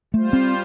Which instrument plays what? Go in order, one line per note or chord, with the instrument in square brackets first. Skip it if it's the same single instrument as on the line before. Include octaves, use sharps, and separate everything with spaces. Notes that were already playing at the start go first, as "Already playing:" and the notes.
[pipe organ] G3 F4 C5 [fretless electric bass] A3
[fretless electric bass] C4